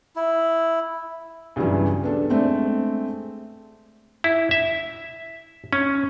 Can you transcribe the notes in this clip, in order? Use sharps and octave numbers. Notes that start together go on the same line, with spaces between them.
E4
B1 G2 C#3 E3 F#3
B3 D4 A4
G#3 A3 C4 D4
E4
E5
C#4